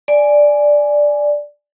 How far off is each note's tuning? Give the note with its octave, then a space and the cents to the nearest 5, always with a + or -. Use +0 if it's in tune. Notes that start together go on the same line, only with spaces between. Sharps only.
D5 +0 G#5 +0